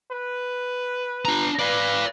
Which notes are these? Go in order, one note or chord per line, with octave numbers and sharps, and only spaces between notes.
B4
D4 A#5
B4 D5 F5